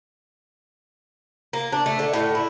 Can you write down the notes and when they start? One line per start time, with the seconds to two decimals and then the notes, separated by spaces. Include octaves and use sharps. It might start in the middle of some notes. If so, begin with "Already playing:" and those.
1.53 A#3
1.72 D4
1.86 A3
1.99 D3
2.13 A2
2.35 E4